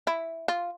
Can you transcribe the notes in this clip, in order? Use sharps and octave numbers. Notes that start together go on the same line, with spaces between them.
E4
F4